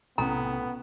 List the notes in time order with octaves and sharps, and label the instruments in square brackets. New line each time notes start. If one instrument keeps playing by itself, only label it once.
[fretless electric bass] B1 C3 C#4 [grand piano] A2 G5 D#6 [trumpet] B3 [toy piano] A#5